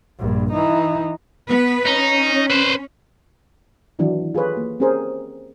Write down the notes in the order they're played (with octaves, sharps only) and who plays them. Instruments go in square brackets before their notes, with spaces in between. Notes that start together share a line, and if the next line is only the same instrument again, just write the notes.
[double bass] A#1 G2
E3 D#4
[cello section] B3 B4
[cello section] C#4 [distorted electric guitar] D#4
[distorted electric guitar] B4 C5
[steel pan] D#3 E3 F#3 D4 E4 F#4
F4 G#4 A4 B4 C#5
A#3
C4 C#4 G4 G#4 A#4 C5